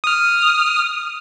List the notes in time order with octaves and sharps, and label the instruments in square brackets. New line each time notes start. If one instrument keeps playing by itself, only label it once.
[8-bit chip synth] D#6 F6